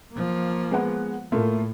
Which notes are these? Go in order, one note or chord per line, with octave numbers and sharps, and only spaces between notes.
F3 A#3
G#3 B3 F#5
A2 A3 A#3 F4